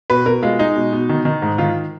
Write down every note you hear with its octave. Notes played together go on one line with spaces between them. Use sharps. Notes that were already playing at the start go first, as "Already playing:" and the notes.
B2 B4
B2 A#4
G#3 F4
G#3 D#4
B2
B2
D#3
D#3
G#2
D#3 F4